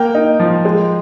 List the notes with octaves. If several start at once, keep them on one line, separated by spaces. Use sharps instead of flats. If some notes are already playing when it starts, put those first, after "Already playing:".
Already playing: A#3 G5
D#4
F3
G#3